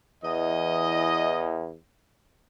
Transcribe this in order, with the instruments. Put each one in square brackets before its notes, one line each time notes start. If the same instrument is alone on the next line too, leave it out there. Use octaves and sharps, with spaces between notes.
[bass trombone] E2 [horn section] E3 D#5